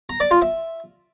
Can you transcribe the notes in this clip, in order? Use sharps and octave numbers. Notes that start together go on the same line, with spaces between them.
A#5
D5
F4
E5